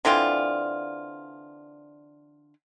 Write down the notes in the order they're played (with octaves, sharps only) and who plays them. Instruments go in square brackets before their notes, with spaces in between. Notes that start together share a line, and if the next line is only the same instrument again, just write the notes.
[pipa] D3 E3 C4 F4